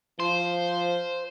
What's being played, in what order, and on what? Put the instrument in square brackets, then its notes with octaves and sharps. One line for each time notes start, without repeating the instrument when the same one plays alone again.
[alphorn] F3 [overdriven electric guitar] C5